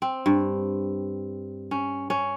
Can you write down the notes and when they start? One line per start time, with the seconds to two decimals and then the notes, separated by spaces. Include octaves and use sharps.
0.02 C4
0.26 G2
1.71 C#4
2.10 C#4